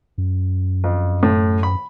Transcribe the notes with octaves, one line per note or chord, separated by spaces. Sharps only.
F#2
F2
A2
B5